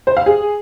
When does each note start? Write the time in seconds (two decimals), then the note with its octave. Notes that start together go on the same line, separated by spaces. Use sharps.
0.07 C5
0.17 F5
0.26 G#4